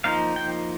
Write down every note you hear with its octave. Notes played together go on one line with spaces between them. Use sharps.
F3 A#3 D#4 F5
G5